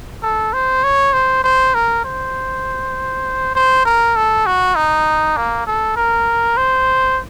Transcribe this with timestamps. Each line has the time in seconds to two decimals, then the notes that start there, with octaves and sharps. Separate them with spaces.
0.23 A4
0.53 C5
0.84 C#5
1.13 C5
1.44 C5
1.74 A#4
2.04 C5
3.55 C5
3.85 A#4
4.16 A4
4.46 F#4
4.76 D#4
5.37 A#3
5.67 A4
5.96 A#4
6.57 C5